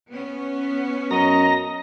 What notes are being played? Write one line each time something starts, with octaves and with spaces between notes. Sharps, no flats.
B3 C#4
F#2 D#5 A#5